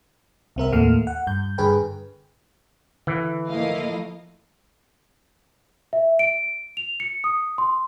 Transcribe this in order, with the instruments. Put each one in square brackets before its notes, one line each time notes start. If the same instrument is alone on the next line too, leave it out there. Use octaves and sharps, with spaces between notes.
[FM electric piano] C2 C4 A#4 E5
D#2 A2 A3 A#3 F6
F#5
G2 G6
G2 D3 G#4 B4 G5
[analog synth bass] D3 [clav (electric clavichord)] E3
[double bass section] F3 A3 A#3 [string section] E4 D#5 F5
[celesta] E5
D7
F7
C#7
D#6
C6